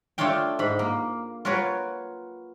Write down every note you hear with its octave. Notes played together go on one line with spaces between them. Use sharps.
A3 D4 F4 C#5 F5 G5
G#2 B5
A#3
F4 F#4 A#4 B4 C#5